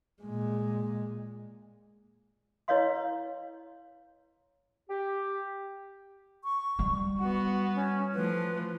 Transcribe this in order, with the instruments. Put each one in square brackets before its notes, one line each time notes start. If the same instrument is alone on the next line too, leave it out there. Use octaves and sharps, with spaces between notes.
[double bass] A#2 G#3
[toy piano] E4 B4 C#5 D#5 F5 C6
[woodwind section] G4
[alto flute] C#6
[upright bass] G3
[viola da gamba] B3 F#4 [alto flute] F#5
[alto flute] C#4
[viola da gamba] E3 F3 A3 [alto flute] B4